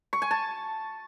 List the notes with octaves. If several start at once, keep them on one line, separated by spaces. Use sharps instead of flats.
C#6
G#5
A5